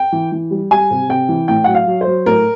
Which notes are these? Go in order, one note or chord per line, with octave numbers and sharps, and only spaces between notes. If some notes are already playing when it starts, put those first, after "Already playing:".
Already playing: G5
E3
E3
G3
G3 G#5
C3
C3 G5
E3
A2 G5
F#3 F#5
F5
F#3
C5
F#3
A2 A#4